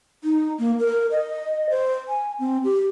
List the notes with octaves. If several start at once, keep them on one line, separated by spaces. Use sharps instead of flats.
D#4
A#3
A#4
D#5
C5
G#5
C4
G4